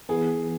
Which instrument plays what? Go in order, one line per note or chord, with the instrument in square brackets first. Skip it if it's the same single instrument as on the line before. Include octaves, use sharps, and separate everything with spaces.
[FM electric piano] E3 B3 [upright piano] G#4